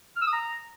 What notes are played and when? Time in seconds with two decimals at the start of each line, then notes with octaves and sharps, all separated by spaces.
0.16 F6
0.22 E6
0.27 D#6
0.33 A#5